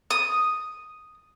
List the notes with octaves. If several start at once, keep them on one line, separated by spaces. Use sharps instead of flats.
D#6